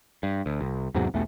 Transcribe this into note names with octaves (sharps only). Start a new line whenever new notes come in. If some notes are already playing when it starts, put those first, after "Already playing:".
G2
D2
C2
E2 G#2 C3 F#3
B1 E2 A3